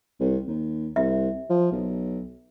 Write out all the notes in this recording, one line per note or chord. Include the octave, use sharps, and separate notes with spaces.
C2
D#2
C2 E5
F3
B1